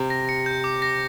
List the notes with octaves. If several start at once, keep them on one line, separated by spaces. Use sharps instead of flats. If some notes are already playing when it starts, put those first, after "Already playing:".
Already playing: C3
A#6
C#7
G6
D6
A#6